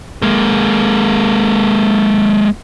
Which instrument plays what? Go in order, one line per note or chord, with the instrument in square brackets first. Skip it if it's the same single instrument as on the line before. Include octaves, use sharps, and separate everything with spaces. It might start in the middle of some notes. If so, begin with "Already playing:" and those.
[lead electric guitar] G#3 A#3